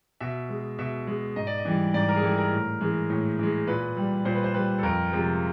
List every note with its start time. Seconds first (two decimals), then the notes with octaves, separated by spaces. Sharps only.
0.20 B2 E5
0.49 G#3
0.79 B2 E5
1.07 G#3
1.36 G#2 D#5
1.47 D5
1.58 D#5
1.65 E3 G3
1.94 G#2 D5
2.08 A#4
2.16 G#4
2.23 E3 G3 A4
2.38 A#4
2.52 A2
2.81 E3 G#3
3.10 A2
3.39 E3 G#3
3.67 A#2 B4
3.97 G3
4.25 A#2 C5
4.35 B4
4.44 C5
4.54 G3 B4
4.79 A4
4.83 F2 A#4
5.12 C3 F3 G#3